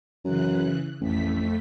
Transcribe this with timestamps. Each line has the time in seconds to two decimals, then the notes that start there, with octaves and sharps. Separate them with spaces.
0.25 F#2 C#3 E3 F#6
1.01 A1 F2 A3 B6